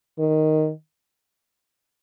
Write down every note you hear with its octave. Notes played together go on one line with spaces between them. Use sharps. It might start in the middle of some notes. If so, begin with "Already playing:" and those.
D#3